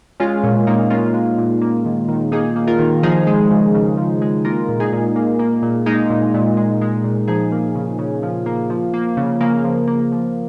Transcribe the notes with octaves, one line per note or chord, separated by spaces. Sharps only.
G#3 C#4 F4
A#2 C#4
A#2 A#3 D#4
G#3 C#4 F4
G#3
A#2
A#3
D#3
D#3
A#3 D#4 G#4
A#3
F4 A#4
D#3
F3 D#4 G#4
G#3
C#3
C#3
F3
G#3
A#3 F4 A#4
A#2
D#4 G#4
A#2
A#3
A#3
A#2
G#3 A#3 D#4
A#2
A#2
G#3
G#3
A#2
F3 D#4 G#4
A#3
C#3
C#3
F3
A#3
F3
A#3
C#3
C#3 A#3
F3
A#3
F3